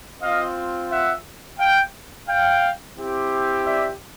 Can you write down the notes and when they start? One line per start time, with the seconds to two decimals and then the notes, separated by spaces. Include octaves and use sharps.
0.21 C4 F4 D#5 F5
0.91 E5 F#5
1.59 F5 G5
2.28 F5 G5
2.98 C4 E4 G4
3.66 D5 E5